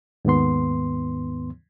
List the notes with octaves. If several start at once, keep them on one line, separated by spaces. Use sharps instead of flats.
D#2 G#2 D#3 B3 C6